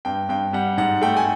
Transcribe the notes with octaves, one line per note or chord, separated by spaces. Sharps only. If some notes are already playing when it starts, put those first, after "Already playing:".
G2 G5
G2 G5
G3 F#5
G#2 F#5
A3 G5
G#5